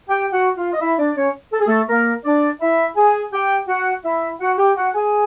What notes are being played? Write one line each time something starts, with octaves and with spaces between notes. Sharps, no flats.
G4 G5
F#4 F#5
F4 F5
D#5
E4 E5
D4 D5
C#4 C#5
A4
G#4
A3 A4
A#3 A#4
D4 D5
E4 E5
G#4 G#5
G4 G5
F#4 F#5
E4 E5
F#4 F#5
G4 G5
F#4 F#5
G#4 G#5